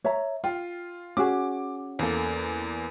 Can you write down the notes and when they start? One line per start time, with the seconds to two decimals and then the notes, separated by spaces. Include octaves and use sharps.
0.04 C#5 E5 A#5
0.44 F4 G5
1.17 C#4 F#4 G#4 D6
1.99 E2 A#3 A4